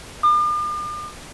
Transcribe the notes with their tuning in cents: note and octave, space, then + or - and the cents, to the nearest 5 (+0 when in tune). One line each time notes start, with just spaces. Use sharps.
D6 +45